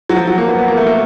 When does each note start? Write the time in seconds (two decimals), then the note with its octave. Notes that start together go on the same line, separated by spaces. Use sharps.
0.09 F#3
0.16 F3
0.27 F#3
0.38 A#3
0.48 B3
0.59 B3
0.68 A#3
0.77 A3
0.86 A#3